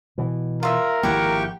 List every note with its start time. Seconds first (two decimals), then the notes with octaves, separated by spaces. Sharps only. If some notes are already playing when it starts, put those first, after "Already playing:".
0.18 B2 E3
0.63 F4 A#4 E5
1.03 G#1 F3 A#3 E4 G4 F#5 G5 C#6